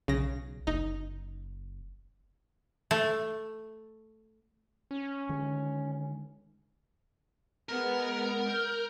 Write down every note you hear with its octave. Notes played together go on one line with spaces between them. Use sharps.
B1 C#3 A#6
F#1 D#4
A3
C#4
D3 D#3 G#3
G#3 B3 A#4
F6 G6